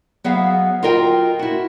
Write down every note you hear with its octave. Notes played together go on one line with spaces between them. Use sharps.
F#3 B3 G#4 E5 F5
F4 F#4 A#4 D#5 G5
E4 F#4